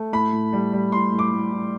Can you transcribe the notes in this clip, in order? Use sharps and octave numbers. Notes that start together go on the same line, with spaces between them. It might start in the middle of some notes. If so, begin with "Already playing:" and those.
Already playing: A3
A2 B5
A2
G3
G3
A2 C6
A2
D6
A2
A2